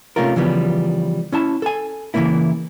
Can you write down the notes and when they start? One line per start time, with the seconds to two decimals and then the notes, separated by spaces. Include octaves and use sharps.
0.16 C3 A3 C#4 D#4 F4 A#4
0.36 C#3 E3 F3 G3 B3
1.32 C#4 E4 A5
1.62 A4 G#5
2.14 C#3 E3 F3 A3 A#3 E4